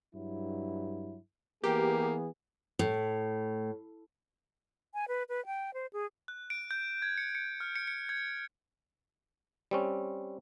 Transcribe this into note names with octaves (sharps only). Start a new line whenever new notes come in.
G2 F#3 E4
E3 A#3 B3 G4 G#4
A2
G#5
B4
B4
G5
C5
G#4
F#6
D7
G6
G#6
C#7
C#7
F6
C#7
C#7
G#6
G3 C4 C#4